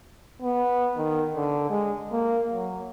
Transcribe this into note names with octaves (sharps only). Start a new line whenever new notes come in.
B3
D#3
D3
G#3
A#3
F#3